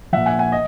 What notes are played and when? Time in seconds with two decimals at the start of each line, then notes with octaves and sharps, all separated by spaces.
0.13 A#2 F3 E5 F#5
0.26 F#5 G#5
0.39 F#5 G#5
0.52 D#5